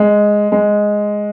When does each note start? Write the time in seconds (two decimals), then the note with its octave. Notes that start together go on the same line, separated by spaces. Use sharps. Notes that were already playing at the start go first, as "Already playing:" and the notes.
Already playing: G#3
0.52 G#3